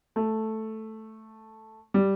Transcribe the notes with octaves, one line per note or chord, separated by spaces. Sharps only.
A3
G3